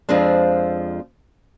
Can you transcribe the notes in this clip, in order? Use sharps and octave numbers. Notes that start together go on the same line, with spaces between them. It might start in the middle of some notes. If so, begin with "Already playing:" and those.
F2 F3 G#3 C4 D4